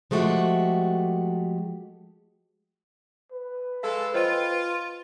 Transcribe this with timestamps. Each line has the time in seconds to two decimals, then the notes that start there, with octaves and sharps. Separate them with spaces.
0.11 F3 G#3 A3 F#4 G4
3.32 B4
3.83 G#3 A4 F5
4.14 F4 C5 D#5 G5